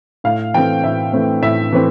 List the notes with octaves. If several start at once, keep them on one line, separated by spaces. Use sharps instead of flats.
A2 F5
E3 A3 C4 G5
A2 E5
E3 A3 C4
A2 E5
E3 A3 C4